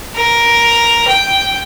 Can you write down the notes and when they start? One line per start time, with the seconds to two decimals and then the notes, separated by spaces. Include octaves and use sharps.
0.15 A#4
1.07 G5